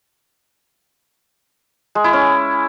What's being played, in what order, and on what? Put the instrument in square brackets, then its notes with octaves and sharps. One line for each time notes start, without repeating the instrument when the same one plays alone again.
[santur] G#3
E4
C#4